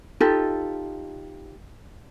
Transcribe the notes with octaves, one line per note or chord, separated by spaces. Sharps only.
D#4 F4 G4 A4